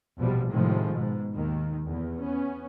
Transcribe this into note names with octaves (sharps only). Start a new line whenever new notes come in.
A#1 E2 B2 F3 G3
A2 C3 D#3 F3 G#3
G#2 B2
D#2 D#3
E2
B3 C#4